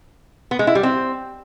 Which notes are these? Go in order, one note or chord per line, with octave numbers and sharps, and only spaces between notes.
B3
G#3
E4
G3
C4